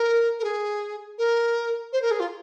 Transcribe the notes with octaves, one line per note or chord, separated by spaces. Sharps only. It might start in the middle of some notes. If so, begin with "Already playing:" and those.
Already playing: A#4
A#4
G#4
A#4
C5
A#4
G#4
F4